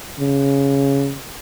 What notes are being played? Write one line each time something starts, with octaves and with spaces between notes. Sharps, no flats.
C#3